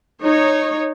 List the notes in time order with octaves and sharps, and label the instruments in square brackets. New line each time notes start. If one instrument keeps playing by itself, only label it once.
[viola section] D#4 C#5